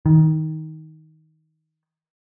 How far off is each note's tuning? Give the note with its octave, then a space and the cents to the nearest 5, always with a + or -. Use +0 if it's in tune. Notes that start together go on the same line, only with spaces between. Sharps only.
D#3 +15